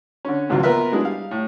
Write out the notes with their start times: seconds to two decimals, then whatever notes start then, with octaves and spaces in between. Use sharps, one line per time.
0.25 D3 C#4
0.49 G#1 C#2 G#2 F3 F#3 F#4
0.63 A#3 B3 F4 A#4 B4 E5
0.92 F#3 G#3 D4 E4 G#4
1.04 G3 F5
1.31 A2